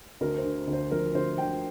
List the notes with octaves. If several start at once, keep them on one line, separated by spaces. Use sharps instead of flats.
D2 A#4
C5
D3
D2
C5
F3 A#4
D2 C5
D3 G5